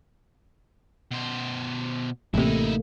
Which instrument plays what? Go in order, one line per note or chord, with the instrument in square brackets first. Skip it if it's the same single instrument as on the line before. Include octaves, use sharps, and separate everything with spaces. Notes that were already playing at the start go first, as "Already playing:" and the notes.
[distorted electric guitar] B2 C5
[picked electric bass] A1 C3 [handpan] A3 A#3 [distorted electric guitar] D#4 E4